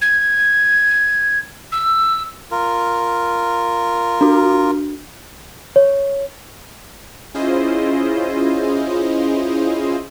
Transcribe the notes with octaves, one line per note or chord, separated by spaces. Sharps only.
G#6
E6
F4 A#4
D4 F#4
C#5
C#4 E4 F4 G#4 C5 D#5